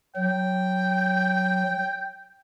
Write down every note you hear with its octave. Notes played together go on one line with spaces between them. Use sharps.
F#3 G5